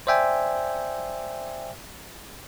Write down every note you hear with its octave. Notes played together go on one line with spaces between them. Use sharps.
C5 D5 E5 G5 G#5